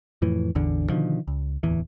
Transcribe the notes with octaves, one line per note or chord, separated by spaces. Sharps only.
F2 A2 E3
A1 E2 D3
B2 D3 D#3 F3
C#2
D1 E2 E3